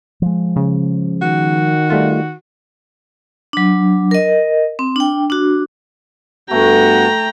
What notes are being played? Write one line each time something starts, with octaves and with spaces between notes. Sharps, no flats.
F3 G#3
C#3
D#3 F#4
G3 A3 F4
F#3 D4
A#4 D#5
C4
D4 G5
D4 F#4
G2 A3 B3 F#4 G5 A#5